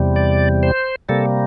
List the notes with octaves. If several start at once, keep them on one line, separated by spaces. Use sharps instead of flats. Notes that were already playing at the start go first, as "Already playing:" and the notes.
Already playing: E2 C3 G3
D5
C5
C3 G3 A#3 A4